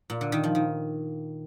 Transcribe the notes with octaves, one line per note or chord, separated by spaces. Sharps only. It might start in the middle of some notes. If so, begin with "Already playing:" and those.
A#2
D3
D#3
F3
D#3